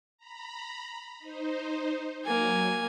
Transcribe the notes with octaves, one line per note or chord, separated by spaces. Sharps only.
A#5 B5
D#4 C5
F#3 A#3 G#5